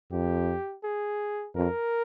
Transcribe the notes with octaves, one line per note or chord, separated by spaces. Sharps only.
F2 G4
G#4
F2 A#4